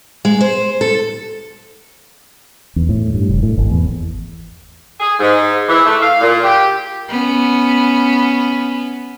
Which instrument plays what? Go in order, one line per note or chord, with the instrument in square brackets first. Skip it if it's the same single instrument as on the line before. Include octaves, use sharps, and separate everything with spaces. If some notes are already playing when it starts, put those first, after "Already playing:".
[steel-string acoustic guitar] G#3
C5
A4
[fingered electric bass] E2
A2
G2
F1
A2
G#1
E2
[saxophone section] G#4
G#2
E3
A3
F5
A#2
G4
[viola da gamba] B3 C#4